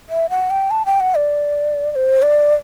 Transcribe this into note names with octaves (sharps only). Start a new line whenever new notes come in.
E5
F#5
G5
A5
G5
F#5
D5
D5
C5
D5